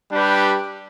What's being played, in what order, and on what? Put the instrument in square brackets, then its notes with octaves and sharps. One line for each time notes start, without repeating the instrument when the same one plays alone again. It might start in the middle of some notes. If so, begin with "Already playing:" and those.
[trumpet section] G3 D4 G4 B4